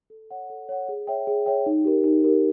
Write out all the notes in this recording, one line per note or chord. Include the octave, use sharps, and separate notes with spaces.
A4
C#5 F#5
A4
C#5 F#5
G#4
C#5 E5 G5
G#4
C#5 E5 G5
D#4
G4 A#4
D#4
G4 A#4